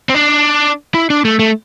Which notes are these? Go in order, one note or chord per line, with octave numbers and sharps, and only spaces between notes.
C4
D4
E4
D4
A3
A3